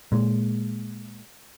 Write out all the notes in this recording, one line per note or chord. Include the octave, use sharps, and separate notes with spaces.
A#2 G#3